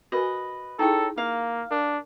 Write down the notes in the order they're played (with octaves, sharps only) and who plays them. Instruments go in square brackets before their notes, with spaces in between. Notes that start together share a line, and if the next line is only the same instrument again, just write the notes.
[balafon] F#4 A#4 G#5 [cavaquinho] B4 D#5
[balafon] D#4 E4 G#4 [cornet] A4 [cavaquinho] C#5 G5 A#5
[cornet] A#3 [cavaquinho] F5
[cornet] D4 [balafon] A#4